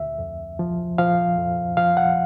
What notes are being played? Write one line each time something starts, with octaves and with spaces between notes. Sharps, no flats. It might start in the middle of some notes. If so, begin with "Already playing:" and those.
Already playing: D2 E5
F2
F3
F3 F5
F2
F3 F5
F#5